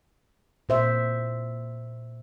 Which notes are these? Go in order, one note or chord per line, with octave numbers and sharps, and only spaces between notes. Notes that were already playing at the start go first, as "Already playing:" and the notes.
A#2 C5 E5